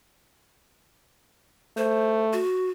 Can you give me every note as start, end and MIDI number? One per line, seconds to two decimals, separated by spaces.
1.77 2.41 57
1.77 2.23 72
2.33 2.70 66